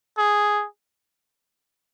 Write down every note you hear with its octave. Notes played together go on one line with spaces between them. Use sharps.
G#4